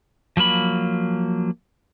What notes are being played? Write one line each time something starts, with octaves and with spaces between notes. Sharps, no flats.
F3 F#3 A#3 B5